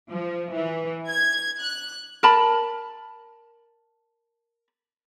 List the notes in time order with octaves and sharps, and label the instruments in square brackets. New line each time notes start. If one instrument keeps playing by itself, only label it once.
[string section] F3
E3
G#6
F#6
[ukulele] A#4 A5 B5